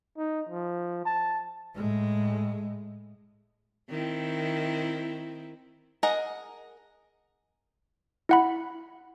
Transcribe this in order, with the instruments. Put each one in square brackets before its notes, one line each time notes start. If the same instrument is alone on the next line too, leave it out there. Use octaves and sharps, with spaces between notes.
[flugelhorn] D#4
F3
A5
[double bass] A2 G#3
[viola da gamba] D#3 C4 E4
[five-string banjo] G#4 A#4 D#5 F#5
[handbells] E4 F#5 B5